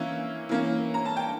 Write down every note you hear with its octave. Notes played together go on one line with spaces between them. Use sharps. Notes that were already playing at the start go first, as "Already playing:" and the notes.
Already playing: E3 A#3 C#4 E5
E3 A#3 C#4
A#5
A5
G5